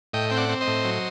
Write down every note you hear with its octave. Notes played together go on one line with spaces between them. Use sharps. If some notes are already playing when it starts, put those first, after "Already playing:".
A2 D#5 G5
C4 G5
D5 F#5
C4
C5 D#5
A2
F#3